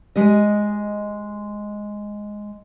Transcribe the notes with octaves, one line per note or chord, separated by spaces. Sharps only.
G#3 G4 D#5